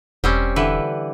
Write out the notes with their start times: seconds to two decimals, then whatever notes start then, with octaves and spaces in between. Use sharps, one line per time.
0.24 E1 G3 C4 C#4
0.56 D3 E3 B4